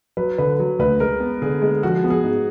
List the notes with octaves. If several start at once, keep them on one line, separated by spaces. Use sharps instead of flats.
F#3 B4
D3 B4
F#3
D2 B4
G#3 A#4
B3
D3 G#4
G#3
F3 F#4
B3
G#4
G#2